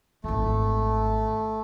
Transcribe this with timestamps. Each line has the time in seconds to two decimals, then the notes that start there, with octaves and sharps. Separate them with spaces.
0.24 D#1 G#1 A3